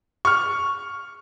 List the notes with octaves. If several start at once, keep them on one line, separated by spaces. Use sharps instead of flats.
C#6 F6